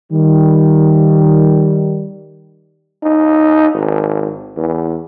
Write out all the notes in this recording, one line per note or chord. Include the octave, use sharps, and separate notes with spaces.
D#3 G3
D#4
G#1
E2